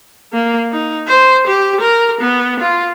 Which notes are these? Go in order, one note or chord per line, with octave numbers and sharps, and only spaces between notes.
A#3
D#4
C5
G4
A#4
B3
F4